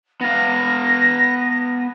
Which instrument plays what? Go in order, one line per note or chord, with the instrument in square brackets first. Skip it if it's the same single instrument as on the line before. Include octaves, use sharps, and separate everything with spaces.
[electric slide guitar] B3 F5 [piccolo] A#6